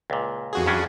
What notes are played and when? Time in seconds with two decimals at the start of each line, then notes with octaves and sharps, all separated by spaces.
0.10 C#2 A#2
0.53 F2 F#4 G#4
0.66 G2 C#4 D4